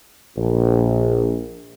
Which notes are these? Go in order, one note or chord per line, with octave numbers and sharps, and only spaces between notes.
A#1